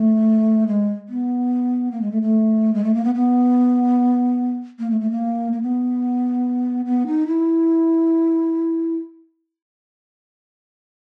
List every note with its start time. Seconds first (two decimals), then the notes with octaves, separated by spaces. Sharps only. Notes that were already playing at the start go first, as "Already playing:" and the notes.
Already playing: A3
0.67 G#3
1.09 B3
1.91 A#3
2.01 G#3
2.12 A3
2.22 A3
2.74 G#3
2.84 A3
2.94 A#3
3.05 B3
3.15 B3
4.79 A#3
4.90 A3
5.01 A3
5.11 A#3
5.52 A#3
5.62 B3
6.86 B3
7.07 D#4
7.27 E4